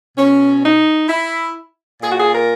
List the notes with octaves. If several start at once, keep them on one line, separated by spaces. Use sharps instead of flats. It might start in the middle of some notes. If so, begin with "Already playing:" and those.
B2 C#4
D#4
E4
A#2 G#4
F#4
G#4
A#4